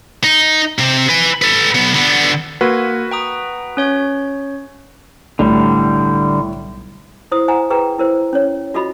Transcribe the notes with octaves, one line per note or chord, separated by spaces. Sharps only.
D#4
C3 C4
B4 G#5
A4 B4
B1 B3
D3 B3
A#3 F#4 A#4 B4 G#6
G5 A#5 D#6
C#4 C#5 G6
B1 A2 D3 G3
E4 C5 D#6
C5 F#5 G#5 A#5
G#4 B4 G5 A#5
E4 A#4 C5
C#4 C#5
F4 F#4 A4 D#5 B5